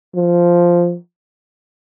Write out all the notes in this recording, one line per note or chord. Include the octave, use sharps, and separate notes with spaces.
F3